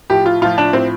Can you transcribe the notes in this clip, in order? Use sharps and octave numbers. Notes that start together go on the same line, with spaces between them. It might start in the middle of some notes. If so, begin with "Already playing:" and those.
A2 F3 G4
F4
A2 F3 F4
D4
A2 F3 C4